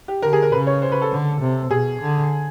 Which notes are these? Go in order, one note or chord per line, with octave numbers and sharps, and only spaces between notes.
G4
D3 A#4
G#4
A#4
C#3 B4
C#5
C5
B4
A4
D3
C3
B2 G#4
D3